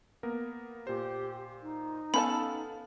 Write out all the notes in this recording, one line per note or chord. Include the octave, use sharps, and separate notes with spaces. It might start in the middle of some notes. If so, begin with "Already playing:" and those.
A#3 B3 A#4
A#2 G4 C5
D#4
B3 C#4 A4 F5 A5 B5